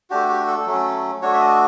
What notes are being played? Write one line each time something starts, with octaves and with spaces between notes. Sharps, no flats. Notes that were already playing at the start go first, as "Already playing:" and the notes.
A3 D4 F#4 G4
G4
A4
F#3 A3 C#4
A3 D4 F#4 C#5
E5
D#5